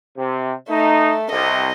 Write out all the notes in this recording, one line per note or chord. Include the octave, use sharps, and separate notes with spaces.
C3
A3 D#4
C2 D#5